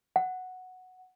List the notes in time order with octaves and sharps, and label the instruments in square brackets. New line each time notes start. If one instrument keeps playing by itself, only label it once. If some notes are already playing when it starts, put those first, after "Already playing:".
[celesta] F#5